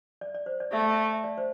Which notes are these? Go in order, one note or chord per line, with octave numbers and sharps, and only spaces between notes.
D5
D5
C5
D5
A3 E5
D5
E5
E5
D5
C5